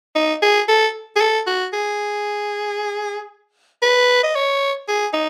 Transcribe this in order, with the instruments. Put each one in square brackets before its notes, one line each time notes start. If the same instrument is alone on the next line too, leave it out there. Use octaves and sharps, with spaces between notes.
[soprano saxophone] D#4
G#4
A4
G#4
A4
F#4
G#4
B4
D#5
C#5
G#4
D#4